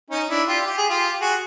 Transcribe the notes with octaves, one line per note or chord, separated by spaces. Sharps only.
C#4 D#4
D4 E4
F4 G4
G4
G#4
F4 G4
F#4 G#4